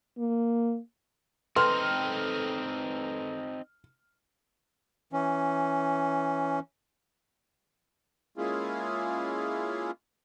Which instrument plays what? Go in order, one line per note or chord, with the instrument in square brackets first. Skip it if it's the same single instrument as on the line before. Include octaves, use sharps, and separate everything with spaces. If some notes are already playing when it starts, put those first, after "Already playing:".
[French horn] A#3
[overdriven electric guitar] C4 D#4 [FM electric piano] A4 B4 G5 [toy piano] C6 [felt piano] F6
[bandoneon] E3 C#4
[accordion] G#3 A#3 C#4 E4 F4 G#4